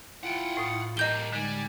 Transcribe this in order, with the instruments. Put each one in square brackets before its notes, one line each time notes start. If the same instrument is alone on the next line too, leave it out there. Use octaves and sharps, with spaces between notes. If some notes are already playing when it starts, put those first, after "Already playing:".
[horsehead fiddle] E4 F4 [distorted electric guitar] F#5 G5
[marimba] A2 D#6
[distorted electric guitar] G3 A#3 [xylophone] D#5 G6 G7
[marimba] D3 G#3 [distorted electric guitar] G3 [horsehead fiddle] D#4 G#5